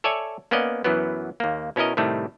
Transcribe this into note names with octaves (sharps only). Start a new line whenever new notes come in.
A4 C#5 D5 E5 G#5
A#3 B3 C#4 D5 D#5
F#2 E3 F#3 B3
D#2 A#3
B2 C#4 E4 A#4 D#5
A2 C3 D#3 G3 A3